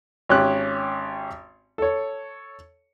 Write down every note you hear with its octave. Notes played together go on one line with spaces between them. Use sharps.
G#1 C#4 G4 F#6
A4 C#5